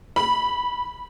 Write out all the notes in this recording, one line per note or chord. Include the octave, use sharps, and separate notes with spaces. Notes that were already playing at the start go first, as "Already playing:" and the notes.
B5